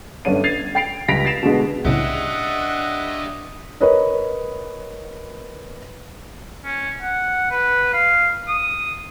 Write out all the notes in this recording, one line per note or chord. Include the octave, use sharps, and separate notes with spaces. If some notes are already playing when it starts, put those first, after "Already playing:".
G1 G2 B3 C#4 D4 D#7
G#6 A6 C7 F7
G5 A6 C7 D7 F7
C#2 G3 A#6 B6 D7 F7
A6 A#6 C7 D7 E7 F7
B2 D3 G#3 B3
C2 A2 C#3 D4 G4 D#5 E5 F#5
A#4 B4 C#5 D#5
C#4
F#5
B4
F5
D#6